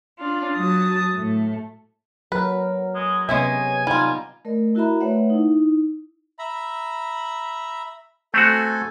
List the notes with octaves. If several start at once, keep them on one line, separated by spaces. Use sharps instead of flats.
D4 F4
F#3 F#4 A5 D#6
A2 A3
F#3 F#4 A#4 B4
G#3
C3 G#3 B3 C#4 D#5 E5 G#5
G3 D#4 F4
A3 A#4 D5 D#5
E4 F#4 A#4 E5 A#5 B5
A3 B4 C#5 D5 E5 F#5
D#4 E4
E5 A#5 B5
A3 C4 F#4 A4 G#5